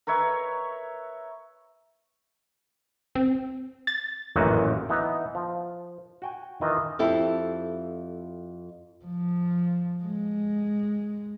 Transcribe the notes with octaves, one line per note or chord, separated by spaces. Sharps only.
A#4 B4 C#5 E5
C4
A6
A1 F#2 A#2 D#3 E3 F#4
E3 B3 D#4
F3
F#4 G5 G#5
D#3 E3 F4 D#5
F2 E4 G4 A4
F3
G#3